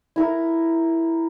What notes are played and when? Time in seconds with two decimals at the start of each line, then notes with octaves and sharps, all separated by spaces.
0.16 E4 A#4